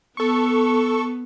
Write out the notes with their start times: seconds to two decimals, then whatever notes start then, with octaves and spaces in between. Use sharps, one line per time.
0.17 B3 A4 C#6